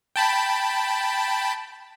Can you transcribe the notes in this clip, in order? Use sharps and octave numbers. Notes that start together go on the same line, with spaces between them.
G5 A5 B5